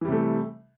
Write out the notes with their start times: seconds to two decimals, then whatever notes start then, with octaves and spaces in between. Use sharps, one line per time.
0.01 E3
0.05 G3
0.08 C3
0.12 A3